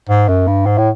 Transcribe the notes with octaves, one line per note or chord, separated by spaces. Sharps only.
G#2
F#2
G2
G#2
A2